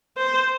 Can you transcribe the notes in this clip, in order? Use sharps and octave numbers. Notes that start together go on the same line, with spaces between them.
C5